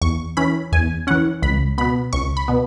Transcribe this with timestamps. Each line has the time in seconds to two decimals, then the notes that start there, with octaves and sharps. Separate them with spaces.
0.01 E2 C#6
0.37 E3 C#4 B5
0.72 E2 G#5
1.07 E3 C#4 F#5
1.42 C#2 B5
1.78 B2 B3 B5
2.13 C#2 C#6
2.37 B5
2.48 B2 B3